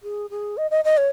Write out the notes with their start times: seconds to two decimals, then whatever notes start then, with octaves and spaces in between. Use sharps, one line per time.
0.03 G#4
0.30 G#4
0.57 D#5
0.71 D#5
0.85 D#5
0.97 C#5